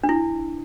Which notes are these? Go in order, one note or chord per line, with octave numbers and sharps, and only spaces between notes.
D4
E4